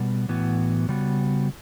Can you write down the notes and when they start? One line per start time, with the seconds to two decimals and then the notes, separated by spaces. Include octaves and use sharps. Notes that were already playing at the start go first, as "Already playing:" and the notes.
Already playing: B2 G3 B3
0.29 A2 E3 B3 F#4
0.89 C#3 G3 B3 F#4